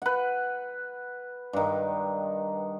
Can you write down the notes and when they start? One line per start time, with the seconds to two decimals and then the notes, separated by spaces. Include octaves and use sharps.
0.02 B4 F#5
1.53 G2 D#3